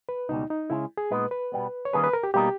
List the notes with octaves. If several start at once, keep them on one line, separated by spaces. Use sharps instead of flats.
B4
C#2 B2 G3 D#4
D#4
C#3 G#3 C#4 E4
G#4
A#2 G#3 B3 D#4 B4
B4
B2 G3 B3
C#5
D#3 G3 A#3 C#4 G#4 B4
B4
A#4
G4
B2 G3 A#3 D#4 G4